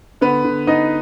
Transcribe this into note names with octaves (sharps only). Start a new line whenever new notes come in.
D3 B3 B4
D3
B3 D#4 D#5